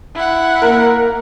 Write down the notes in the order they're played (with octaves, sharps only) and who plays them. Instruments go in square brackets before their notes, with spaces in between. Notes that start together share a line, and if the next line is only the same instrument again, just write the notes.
[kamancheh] E4 F#5
[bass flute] A#3 [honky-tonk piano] A#4